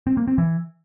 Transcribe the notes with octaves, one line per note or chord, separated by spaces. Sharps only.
C4
A#3
C4
E3